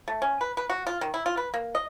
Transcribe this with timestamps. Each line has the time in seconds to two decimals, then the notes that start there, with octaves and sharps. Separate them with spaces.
0.08 A3
0.22 C#4
0.41 B4
0.57 B4
0.70 F#4
0.87 F4
1.01 D#3
1.14 E4
1.26 F4
1.37 B4
1.54 A#3
1.75 D#5